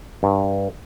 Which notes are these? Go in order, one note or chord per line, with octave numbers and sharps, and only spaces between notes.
G2